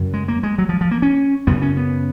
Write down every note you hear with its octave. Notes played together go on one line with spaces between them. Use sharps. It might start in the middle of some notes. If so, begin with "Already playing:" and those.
Already playing: F#2 C#3
G#3
A#3
G#3
F#3
F3
F3
A#3
C#4
F#2 C#3 B3
C#4
B3